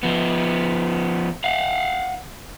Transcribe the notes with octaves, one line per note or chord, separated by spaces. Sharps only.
F3 B3
F5 F#5